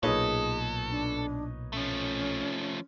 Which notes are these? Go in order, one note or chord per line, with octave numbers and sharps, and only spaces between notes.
B1 A#2 D#4 G#4 A4 B4 C#5
D4
F3 A3 C#4